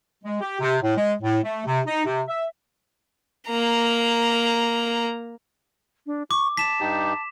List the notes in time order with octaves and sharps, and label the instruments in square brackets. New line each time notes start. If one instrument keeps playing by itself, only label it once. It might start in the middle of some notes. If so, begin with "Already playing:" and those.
[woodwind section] G#3
G4
C3
A2
G#3
A2
A3
C3
D#4
C3
E5
[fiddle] A#3 A#5
[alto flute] D4
[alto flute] C#6 [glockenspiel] D6
[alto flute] A5 [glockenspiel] B6 E7
[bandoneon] G2 D#4 G4